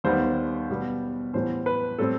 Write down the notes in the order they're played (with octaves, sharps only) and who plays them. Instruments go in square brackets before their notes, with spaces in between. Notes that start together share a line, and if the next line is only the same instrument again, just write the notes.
[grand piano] D#2 D#3 G3 B3 C5
B2 G3 B3
A2 E3 G3 B3 C5
B4
A2 G3 C4 A4